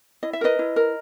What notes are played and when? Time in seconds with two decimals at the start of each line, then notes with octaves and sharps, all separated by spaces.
0.23 E4 D#5
0.33 E5
0.41 A#4 B4 D#5
0.59 E4
0.76 A#4